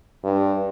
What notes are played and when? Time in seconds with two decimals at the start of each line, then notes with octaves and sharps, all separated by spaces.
0.24 G2